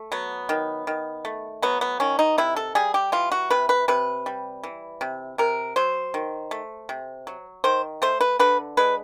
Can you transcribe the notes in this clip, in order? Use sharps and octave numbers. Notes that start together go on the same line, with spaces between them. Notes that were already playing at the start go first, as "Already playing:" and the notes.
Already playing: A3
F#3 B3
D#3
D#3
A3
F#3 B3
B3
D#3 C#4
D#4
C3 E4
A4
G3 G#4
G4
E3 F4
F#4
C3 B4
B4
C3 B4
G3
E3
C3
C3 A#4
F#3 C5
D#3
A3
C3
F#3
D#3 C5
A3 C5
B4
D3 B4
G#3 B4